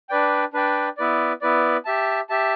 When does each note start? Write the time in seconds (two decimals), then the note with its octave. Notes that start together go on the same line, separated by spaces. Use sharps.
0.09 D4 B4 D5 G5
0.53 D4 B4 D5 G5
0.97 B3 E4 B4 D5
1.42 B3 E4 B4 D5
1.85 G4 E5 A5
2.29 G4 E5 A5